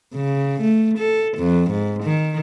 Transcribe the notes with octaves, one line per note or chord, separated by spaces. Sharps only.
C#3
A3
A4
F2
G#2
D#3